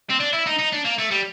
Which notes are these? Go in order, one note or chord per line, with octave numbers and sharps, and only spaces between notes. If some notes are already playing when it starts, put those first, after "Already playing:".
C4
D4
E4
D#4
D#4
D4
A#3
A3
G3